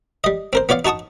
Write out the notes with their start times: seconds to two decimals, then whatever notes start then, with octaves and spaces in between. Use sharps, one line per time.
0.24 G3 D#5
0.53 C4 A#4 C5
0.69 B3 F4 C#5 D5 F5
0.85 D#4 F#4 A5 C#6 D#6